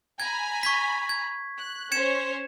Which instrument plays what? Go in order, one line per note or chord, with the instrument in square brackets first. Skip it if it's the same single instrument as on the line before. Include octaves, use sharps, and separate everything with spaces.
[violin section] G#5 A#5 B5 [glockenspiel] G#6
[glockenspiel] C#6 G#6 B6
G#6
[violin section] F#6
[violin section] C#4 C5 C#5 [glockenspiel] G#6 C#7 E7